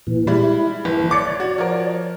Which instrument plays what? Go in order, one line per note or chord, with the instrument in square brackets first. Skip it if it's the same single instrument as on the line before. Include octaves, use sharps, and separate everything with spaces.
[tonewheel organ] A#2 E3
[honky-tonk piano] G3 G#3 B5 [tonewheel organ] E4
[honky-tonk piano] F#1 [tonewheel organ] E3
[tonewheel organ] C#5 D5 [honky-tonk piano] D6 C#7
[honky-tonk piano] F#4
F3 A#4